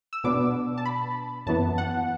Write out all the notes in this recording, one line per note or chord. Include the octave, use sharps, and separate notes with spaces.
E6
B2 B3 D4 D6
A5
B5
F#2 E3 B3 A5
F#5